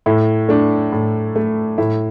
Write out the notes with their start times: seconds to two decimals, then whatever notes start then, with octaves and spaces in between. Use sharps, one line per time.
0.06 A2 E4
0.49 A3 D4
0.92 A2
1.36 A3
1.78 A2 E4